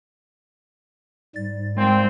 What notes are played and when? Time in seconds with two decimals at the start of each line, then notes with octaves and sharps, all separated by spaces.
1.36 G#2 G3 A6
1.77 A#2 G#3 C4